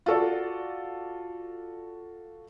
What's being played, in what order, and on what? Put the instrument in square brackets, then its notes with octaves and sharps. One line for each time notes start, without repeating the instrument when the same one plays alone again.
[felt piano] F4 F#4 A4 D5